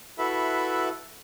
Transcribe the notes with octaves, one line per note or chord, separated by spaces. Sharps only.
E4 F#4 A4 B4 E5 B5